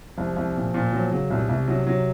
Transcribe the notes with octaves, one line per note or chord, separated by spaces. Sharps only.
C2 F3
C2
A#2
A#2
F3 F#3
C#3 F#3
C2 A#2
C2 C3
F#3
F#3